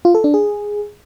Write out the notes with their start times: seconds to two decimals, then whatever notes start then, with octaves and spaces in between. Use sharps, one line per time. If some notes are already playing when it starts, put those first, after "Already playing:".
0.05 F4
0.15 A4
0.24 D4
0.34 G#4